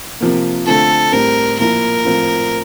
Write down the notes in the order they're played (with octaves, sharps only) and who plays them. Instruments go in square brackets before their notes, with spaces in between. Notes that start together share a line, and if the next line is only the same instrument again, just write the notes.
[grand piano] C3 F3 A#3
[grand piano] D3 A3 C4 F4 [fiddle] A4
[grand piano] A2 G3 C4 [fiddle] A#4
[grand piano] A#2 F3 A#3 E4 [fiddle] A#4
[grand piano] A2 F3 C4 F4